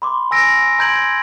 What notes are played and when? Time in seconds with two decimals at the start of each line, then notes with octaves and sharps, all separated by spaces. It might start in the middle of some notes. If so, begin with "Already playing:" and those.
0.02 B5 C6 D6
0.31 G#5 E6 A#6 D7
0.79 A#5 C6 G6 G#6 D7 F#7